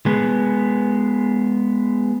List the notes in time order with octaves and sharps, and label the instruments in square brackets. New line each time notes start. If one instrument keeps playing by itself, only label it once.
[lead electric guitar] G#3 B3